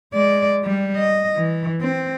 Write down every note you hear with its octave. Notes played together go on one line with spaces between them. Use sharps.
G#3 D5
G3
D#5
E3
C4